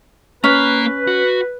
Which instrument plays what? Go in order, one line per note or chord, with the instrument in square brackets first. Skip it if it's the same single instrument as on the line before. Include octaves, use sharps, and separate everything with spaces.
[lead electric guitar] A#3 A#5 [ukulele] C#4 [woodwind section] B4
[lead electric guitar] F#4